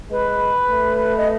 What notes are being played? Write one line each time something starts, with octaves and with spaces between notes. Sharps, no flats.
G#3 B4
A3
D#5